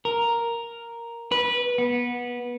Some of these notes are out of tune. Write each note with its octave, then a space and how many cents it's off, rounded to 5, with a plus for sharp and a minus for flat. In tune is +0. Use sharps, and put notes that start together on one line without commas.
A#4 +0
B4 -15
B3 -20